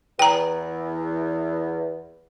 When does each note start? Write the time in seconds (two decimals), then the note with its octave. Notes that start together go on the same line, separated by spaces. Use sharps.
0.19 E2 G5 A#5